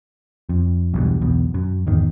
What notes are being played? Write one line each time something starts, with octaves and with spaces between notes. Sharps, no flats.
F2
B1 E2 G2
B1 E2
F#2
G#1 E2 D#3